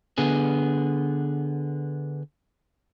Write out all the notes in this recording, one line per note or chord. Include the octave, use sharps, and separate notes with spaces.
D3 B3 G#4